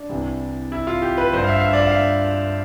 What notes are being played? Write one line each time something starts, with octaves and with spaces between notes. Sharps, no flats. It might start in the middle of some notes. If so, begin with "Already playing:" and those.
Already playing: D4
C2 C3 E3
E4
F4
G4
B4
G2 D3 C5
F5
E5
F5
E5
D5
E5
F5
E5